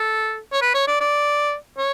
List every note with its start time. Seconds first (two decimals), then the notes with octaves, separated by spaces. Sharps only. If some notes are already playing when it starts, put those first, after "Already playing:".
Already playing: A4
0.53 C#5
0.62 B4
0.74 C#5
0.87 D5
1.00 D5
1.78 C#5